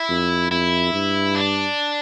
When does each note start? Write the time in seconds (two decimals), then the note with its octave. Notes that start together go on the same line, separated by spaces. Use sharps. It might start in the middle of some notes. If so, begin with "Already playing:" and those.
Already playing: E4
0.09 F2
0.50 F2 E4
0.93 G2
1.35 D4